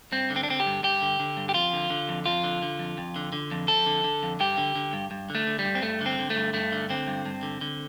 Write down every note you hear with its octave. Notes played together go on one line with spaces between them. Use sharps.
G2 C4
D3
C4
D4
D3 C4
G4
G2
G2 G4
D3
D3
G2
G4
F2 F4
D3
D3
F2
F2 F4
D3
D3
F2
F2
D3
D3
F2
F2 A4
D3
D3
F2
G2 G4
D3
D3
G2
G2
D3 A3
D3
G3
G2
C4
G2 A3
D3
C4
D3
A3
G2
G2 A3
D3
D3 C4
G2
G2
D3
D3